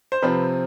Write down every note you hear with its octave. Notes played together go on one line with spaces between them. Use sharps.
C5
C3 F3 C4 B4